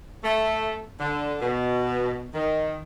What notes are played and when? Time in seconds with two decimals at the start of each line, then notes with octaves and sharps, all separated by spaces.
0.24 A3
0.99 D3
1.40 B2
2.33 D#3